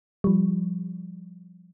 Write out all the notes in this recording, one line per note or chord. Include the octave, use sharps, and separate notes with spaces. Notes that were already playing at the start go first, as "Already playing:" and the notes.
F3 G3